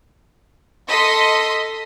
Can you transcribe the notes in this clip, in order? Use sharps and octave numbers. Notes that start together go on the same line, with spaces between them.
A4 D#5 C6 D#6 B6